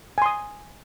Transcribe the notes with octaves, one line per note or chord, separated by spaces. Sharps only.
G#5 C6 D#6